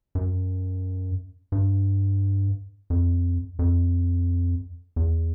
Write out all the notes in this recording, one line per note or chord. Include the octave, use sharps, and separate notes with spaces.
F#2
G2
F2
F2
E2